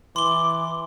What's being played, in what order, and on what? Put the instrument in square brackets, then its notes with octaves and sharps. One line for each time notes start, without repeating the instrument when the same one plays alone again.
[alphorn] E3 [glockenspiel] C6 G7 [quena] D6